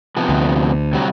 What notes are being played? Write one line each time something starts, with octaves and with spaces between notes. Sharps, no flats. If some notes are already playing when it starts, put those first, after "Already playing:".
C3 F3 B3
D2
C3 F#3 G3